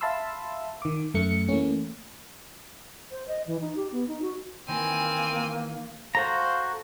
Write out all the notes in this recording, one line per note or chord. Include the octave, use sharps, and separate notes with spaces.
E5 F5 A5 B5 C6 E6
D#3 D6
F#2 A3 C#7
E3 A3 A#3 C#4
C5
D#5
E3
D#4
G4
B3
D#4
F#4
D#3 E3 A#3 C4 G#5
F#4 A4 C5 F5 A#5